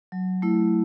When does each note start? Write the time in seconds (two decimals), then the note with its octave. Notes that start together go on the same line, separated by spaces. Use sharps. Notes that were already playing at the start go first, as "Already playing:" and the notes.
0.12 F#3
0.42 A3 E4